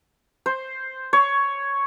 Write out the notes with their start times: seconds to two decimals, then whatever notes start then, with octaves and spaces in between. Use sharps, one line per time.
0.46 C5
1.13 C#5